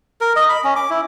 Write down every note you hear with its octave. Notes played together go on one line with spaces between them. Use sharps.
A#4
D#5
B5
C#4
D6
E4